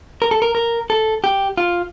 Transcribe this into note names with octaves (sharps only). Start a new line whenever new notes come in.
A#4
A4
A#4
A#4
A4
G4
F4